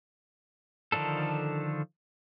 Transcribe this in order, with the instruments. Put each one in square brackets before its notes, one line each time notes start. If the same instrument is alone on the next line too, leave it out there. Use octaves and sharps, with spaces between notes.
[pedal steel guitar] D3 D#3 F3 D4 A4